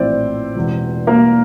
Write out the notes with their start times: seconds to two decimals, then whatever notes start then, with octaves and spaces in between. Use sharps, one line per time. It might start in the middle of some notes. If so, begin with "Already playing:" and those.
Already playing: A#1 A2 E3 C4 E4 C5 D5
0.55 E1 E2 E3
1.07 A#3 A#4